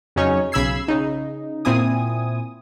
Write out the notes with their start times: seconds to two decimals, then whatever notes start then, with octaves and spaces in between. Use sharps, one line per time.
0.16 F2 C#3 F#3 C#4 D#4 C#5
0.52 B1 C#3 B5 E6 G#6 C7
0.88 C#3 D#4
1.65 A#2 C4 E4 G#5 D#6